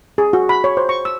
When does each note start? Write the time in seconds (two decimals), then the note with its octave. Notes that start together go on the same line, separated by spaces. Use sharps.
0.18 G#4
0.33 F#4
0.49 B5
0.64 C#5
0.77 C5
0.89 C#6
1.05 E6